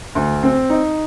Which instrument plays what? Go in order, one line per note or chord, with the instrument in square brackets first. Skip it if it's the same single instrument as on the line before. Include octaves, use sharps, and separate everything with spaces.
[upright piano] D2
C4
D#4